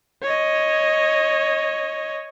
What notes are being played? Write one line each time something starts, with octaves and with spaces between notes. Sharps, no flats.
C#5 D#5